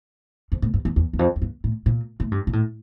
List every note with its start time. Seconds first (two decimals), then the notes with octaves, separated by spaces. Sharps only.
0.52 F2
0.62 A2
0.74 G2
0.85 E2
0.96 E2
1.13 E2
1.19 F2
1.36 F2
1.42 G2
1.64 A2
1.86 A#2
2.20 A2
2.32 G2
2.47 A#2
2.53 A2